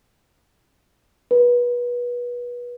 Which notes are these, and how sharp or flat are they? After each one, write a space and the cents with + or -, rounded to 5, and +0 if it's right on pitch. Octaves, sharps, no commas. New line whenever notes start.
B4 -25